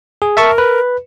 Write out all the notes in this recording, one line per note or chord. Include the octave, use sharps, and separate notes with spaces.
G#4
A#4 E5 A5 C#6
B4